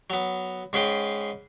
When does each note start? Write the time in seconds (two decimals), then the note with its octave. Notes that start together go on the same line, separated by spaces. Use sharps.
0.10 F#3 B3
0.73 G#2 C#4 G#4 B4 G5